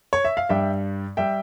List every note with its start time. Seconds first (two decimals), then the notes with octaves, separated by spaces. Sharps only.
0.13 C#5
0.25 E5
0.37 F5
0.49 G2 G3 E5 G5
1.17 G3 E5 G5